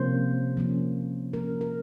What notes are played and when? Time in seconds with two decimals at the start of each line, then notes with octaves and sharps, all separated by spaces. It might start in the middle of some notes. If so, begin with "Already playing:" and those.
Already playing: C3 F3 A#3 C#4 C5
0.57 F3 A#3 C#4
1.33 F3 A#3 C#4 A#4
1.61 A#4